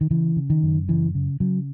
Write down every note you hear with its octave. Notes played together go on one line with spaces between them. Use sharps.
D#3
C#3 E3
C#3
D#3
F#2
C#3 E3
C#3
C#3 F#3